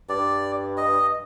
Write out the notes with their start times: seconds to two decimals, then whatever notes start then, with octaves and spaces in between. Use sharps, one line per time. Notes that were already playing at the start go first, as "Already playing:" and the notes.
0.09 G2 D5
0.78 D#5